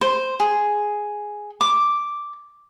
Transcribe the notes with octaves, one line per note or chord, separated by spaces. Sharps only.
C5
G#4
D6